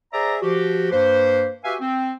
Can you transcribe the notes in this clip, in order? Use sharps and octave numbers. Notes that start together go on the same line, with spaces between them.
G#4 C5 D5 E5 A#5
F3 F#4 G4
G2 A#3 B4 C5
F#4 G4 B4 E5 F5 G#5
C4